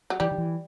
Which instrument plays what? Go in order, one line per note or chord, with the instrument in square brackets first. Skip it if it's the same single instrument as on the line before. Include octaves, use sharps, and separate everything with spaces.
[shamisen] F#3
[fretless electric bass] E3 [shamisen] G3
[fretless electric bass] D#3
E3